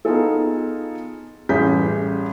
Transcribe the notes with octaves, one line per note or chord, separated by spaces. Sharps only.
B3 D#4 F4 G#4 A4
A1 G3 C#4 G#4 G6 B6